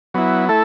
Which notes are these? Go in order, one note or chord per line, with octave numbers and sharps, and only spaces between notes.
F#3 B3 E4
A3 E4 A4